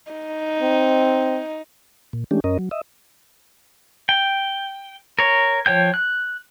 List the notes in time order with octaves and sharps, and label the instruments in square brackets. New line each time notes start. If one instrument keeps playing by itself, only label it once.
[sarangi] D#4
[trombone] C4
[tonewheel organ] A#2
E3 G#3 A3 C#4 D4 G4
F#2 C#4 A#4 D#5
F#3
D#5 E5
[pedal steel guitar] G5
A#4 C#5
F3 C#5 G5 G6
F#6